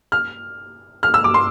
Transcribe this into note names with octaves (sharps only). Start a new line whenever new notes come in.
F6
F6
E6
D6
C6